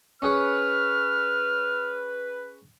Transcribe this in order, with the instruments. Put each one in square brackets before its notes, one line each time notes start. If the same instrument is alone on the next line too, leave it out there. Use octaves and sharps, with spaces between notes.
[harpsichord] C#4 G#4 C#5 [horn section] B4 [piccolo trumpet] F6